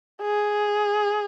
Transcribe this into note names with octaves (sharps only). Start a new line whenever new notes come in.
G#4